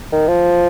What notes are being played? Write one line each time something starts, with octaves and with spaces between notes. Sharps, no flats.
D#3
F3